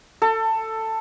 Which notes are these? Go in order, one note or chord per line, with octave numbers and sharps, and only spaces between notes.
A4